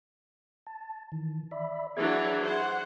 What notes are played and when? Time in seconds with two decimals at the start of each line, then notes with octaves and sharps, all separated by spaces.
0.67 A5
1.12 D#3 E3
1.51 D5 E5 B5
1.97 E3 F#3 D4 G#4 E5 G#6
2.44 C5 F#5